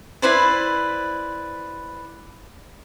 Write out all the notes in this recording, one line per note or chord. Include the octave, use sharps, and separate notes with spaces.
E4 B4 C5 D5